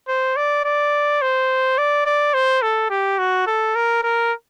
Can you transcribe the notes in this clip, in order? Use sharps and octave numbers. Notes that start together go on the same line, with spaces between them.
C5
D5
D5
C5
D5
D5
C5
A4
G4
F#4
A4
A#4
A#4